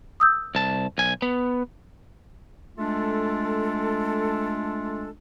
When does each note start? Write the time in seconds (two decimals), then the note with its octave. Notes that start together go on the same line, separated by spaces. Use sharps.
0.20 D#6 E6 G6
0.55 C2 A5
0.98 B1 G#5
1.22 B3
2.78 G#3 A3 D4 F4 A4